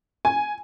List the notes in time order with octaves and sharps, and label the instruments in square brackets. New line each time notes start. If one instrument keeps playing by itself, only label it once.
[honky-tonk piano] G#5